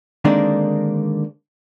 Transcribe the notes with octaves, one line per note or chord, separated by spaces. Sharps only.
D3 D#3 G#3 A#3 C4 D4